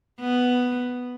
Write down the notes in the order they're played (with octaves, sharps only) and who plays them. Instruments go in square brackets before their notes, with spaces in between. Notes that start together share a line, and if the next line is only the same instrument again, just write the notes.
[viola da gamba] B3